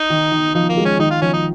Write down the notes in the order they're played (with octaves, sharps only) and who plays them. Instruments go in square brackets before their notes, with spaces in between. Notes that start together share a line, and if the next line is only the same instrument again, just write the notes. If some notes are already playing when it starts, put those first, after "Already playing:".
Already playing: [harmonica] D#4
[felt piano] D#3
D#3
[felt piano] F3 [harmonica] D#4
[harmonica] A#3
[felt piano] G#3
[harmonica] C#4
[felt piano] D#3 [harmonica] D#4
[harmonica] F4
[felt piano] F3 [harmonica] C#4
[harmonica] D#4